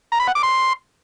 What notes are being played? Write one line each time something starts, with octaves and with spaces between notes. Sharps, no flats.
A#5
B5
F#5
D6
C6